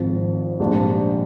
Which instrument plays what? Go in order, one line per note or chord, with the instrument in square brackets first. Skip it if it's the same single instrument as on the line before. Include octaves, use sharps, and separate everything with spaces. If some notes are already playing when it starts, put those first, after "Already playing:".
Already playing: [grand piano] G#1 G#2 F3 C4
A#1 G#2 G3 D4 F4